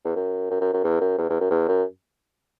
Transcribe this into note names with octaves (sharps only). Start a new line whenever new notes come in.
E2
F#2
F#2
F#2
F#2
E2
F#2
E2
E2
F#2
E2
F#2